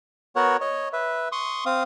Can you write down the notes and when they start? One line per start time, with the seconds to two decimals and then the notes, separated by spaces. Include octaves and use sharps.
0.36 B3 F#4 A#4 C#5 F#5
0.61 C#5 D#5
0.93 B4 E5
1.32 C6 C#6 D#6
1.66 C4 F5 D#6